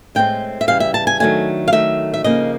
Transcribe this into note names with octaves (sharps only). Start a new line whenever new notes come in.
A2 F3 G#3 C4 G5
E5
C#3 E3 G3 F5
E5
A5
G#5
D#3 F#3 A3 D4 G#5
F5
D#3 F#3 A3 E5
E5
C#3 F3 A#3 D#4 D#5